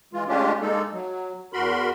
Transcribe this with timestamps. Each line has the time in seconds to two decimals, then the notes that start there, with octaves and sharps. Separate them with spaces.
0.13 E3 G#3 F4
0.28 G#3 A3 C#4 D4 F4 G4
0.61 G#3 A#3 D#4 A4
0.93 F#3
1.53 E2 F#4 A#4 B5 C6